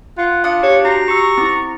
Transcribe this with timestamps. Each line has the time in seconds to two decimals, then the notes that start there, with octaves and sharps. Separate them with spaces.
0.18 F4 F#5
0.44 D4 F5 D#6 C#7
0.63 G4 C#5
0.85 F#4 A#5
1.08 G4 C#6 E6
1.38 C4 E4